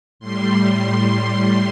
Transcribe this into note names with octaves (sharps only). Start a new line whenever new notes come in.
A2 G3 C6